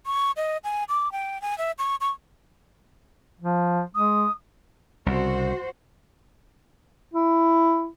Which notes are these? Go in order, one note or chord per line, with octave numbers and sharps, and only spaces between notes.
C#6
D#5
G#5
D6
G5
G#5
E5
C#6
C#6
F3
G#3 D#6
C2 C#3 F#4 C5
E4